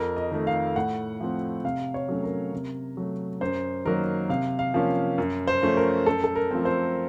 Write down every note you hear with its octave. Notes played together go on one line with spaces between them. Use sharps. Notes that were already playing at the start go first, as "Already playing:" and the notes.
Already playing: F2 A#4
D#5
D#3 A3
F5
A2 F#5
F3 A3 C4
C3 F5
C#5
F#3 A3 C#4
A#4
C3
F#3 A3
F#2 C5
D#3 F#3 A#3 A#4
C3 F5
F5
F3 A#3 C#4
F#2
C5
F3 A3 C#4
A#4
F#2 A4
A4
A#4
F3 A3 C4
C5